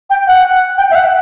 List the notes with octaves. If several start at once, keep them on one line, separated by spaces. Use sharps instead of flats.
G5
F#5
G5
E5
F#5